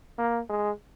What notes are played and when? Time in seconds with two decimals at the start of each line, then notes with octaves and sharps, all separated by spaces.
0.18 A#3
0.49 G#3